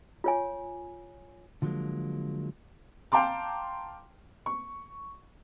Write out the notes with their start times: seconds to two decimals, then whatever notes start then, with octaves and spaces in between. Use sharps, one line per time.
0.24 F4 C#5 G#5
1.62 D3 F3 F#3 G#3 A#3
3.12 F5 G5 A5 A#5 C6 D6
4.46 C#6